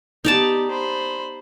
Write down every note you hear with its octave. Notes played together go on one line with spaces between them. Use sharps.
B3 D#4 G4 D5 A5
C5 B5